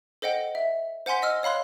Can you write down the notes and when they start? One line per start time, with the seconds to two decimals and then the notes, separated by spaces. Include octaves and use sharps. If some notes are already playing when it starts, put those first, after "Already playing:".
0.22 A4 C5 D#5 F#5 G5
0.55 E5
1.06 C5 F#5 G#5 C6 B6
1.22 D#5 E6 F6
1.43 C#5 F5 B5 C6 F#6